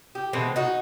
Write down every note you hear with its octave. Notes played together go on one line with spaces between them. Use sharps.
G4
B2 E3 G#3 C4
D#4 F#4